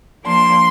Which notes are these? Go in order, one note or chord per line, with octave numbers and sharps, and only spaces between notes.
F3 A#3 D4 C6